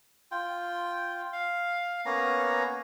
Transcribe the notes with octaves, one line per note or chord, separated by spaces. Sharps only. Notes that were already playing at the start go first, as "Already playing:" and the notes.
F4 G5
F5
A#3 B3 C#4 A#5